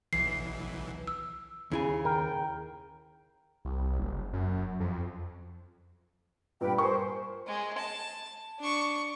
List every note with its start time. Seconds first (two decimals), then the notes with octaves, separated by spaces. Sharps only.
0.13 B1 E3 C7
1.07 E6
1.71 D#2 C#3 E4 G#5
2.05 A#4 G5
3.65 C2
4.00 F#1
4.33 F#2
4.80 F2
6.61 G2 A#2 B4 G5
6.78 A#4 C5 G#5 C#6
7.47 G#3
7.78 A5
8.60 D4 C#6